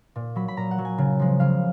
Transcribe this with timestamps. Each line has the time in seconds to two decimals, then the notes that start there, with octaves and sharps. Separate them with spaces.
0.16 A#2
0.36 F#3 B5
0.48 B5
0.57 A#2 A#5
0.71 F#5
0.78 F#3
0.85 G#5
0.98 C#3
1.19 F3 G#3
1.40 C#3 F5